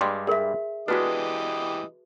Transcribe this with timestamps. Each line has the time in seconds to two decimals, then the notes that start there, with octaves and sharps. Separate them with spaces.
0.01 G2 G3 G#3 C6
0.27 G#4 A#4 D5 E5
0.88 E3 G#3 B3 D4 F#4 G4 B4 D#5